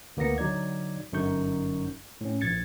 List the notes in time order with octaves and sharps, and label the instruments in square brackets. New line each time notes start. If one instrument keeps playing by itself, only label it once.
[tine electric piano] D2 A#3 B3 A#6 C#7
D3 F#3 D#4 D5 G#6
G1 F#2 D3 D#4 C#6 G6
A2 C#4
A#1 G#6 A6 C#7